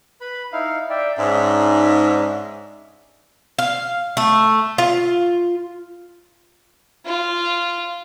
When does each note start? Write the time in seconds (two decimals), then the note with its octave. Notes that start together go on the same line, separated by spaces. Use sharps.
0.21 B4 B5
0.53 D#4 E4 F5
0.90 D5 E5 G5
1.18 G#2 C#4 D4 E5
3.59 F5
4.17 A3
4.78 F4
7.05 F4